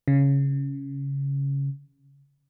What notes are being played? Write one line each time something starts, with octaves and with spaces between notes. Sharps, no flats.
C#3